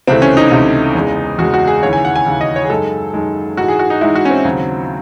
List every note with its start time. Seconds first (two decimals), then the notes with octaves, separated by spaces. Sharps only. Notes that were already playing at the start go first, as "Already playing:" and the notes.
0.07 C#2 C3 E3 A3 C4
0.22 C#4
0.37 D#4
0.51 C#2 C3 E3 A3
0.95 E2 C#3 G#3
1.38 E2 C#3 G#3 F#4
1.54 F#4
1.67 G#4
1.83 D#2 C#3 E3 C#5
1.93 G#5
2.05 F#5
2.16 G#5
2.26 D#2 C#3 E3
2.41 D#5
2.56 C#5
2.65 G#4
2.70 F#2 D#3 G#3 A4
3.14 F#2 D#3 G#3
3.57 G#2 E3 G#3 F#4
3.68 G#4
3.79 F#4
3.90 D#4
4.01 G#2 E3 G#3 E4
4.15 F#4
4.25 C#4
4.30 C4
4.45 D#2 C#3 F#3